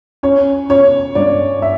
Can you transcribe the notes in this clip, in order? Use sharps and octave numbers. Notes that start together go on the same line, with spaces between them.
C#4 C#5
C#4 C#5
G2 D5
E5